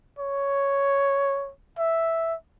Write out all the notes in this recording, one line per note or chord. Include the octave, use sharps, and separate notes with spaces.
C#5
E5